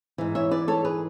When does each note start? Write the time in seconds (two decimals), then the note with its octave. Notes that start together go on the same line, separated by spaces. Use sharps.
0.18 G#2 E3
0.35 C#5 E5
0.51 B4 D5
0.68 A4 C#5
0.84 G#4 B4